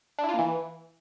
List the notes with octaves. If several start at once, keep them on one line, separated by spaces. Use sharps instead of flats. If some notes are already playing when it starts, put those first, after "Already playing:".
D4
E4
F4
A#3
E3